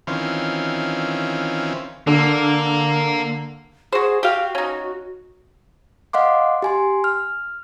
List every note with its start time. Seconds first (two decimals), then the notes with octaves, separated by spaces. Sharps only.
0.07 D#3 E3 C4 C#4 F4
2.07 D3 A#3
3.92 F#4 G#4 C5
4.23 F#4 G4 F5
4.55 C#4 D#4
6.13 D#5 F5 F#5 C6 D6
6.62 G4 G#5 C6
7.04 F6